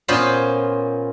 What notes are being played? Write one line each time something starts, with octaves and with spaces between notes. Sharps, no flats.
A#2 B3 C#4 F4 C5 B5